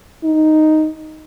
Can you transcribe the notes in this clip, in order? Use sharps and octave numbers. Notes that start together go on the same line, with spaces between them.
D#4